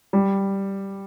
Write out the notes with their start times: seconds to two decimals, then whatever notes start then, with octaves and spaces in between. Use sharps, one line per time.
0.13 G3